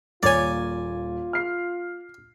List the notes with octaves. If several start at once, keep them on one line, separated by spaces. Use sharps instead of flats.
D#1 A#3 F4 C#5 D5 G#5
F6 C7